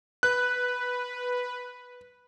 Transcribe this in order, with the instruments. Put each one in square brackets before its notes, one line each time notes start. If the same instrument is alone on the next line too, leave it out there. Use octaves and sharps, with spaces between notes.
[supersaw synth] B4 [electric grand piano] F#6